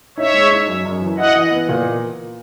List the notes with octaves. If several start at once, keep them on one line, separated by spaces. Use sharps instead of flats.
D#4 C#5 E5
G#3
D#4
F#2
F#2
E3
E4 D#5 F#5
E3
B3
A#2